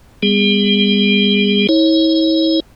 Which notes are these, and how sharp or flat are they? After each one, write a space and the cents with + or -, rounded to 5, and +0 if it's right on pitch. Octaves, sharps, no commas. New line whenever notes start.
G3 +35 B3 +10 G#4 -20
E4 -40 C#5 -20